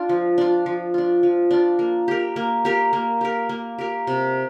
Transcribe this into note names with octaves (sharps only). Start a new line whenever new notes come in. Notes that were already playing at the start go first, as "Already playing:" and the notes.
Already playing: D4 F4
F3
D4 F4
F3
D4 F4
F3
D4 F4
A#3
G4 A#4
A#3
G4 A#4
A#3
G4 A#4
A#3
G4 A#4
C3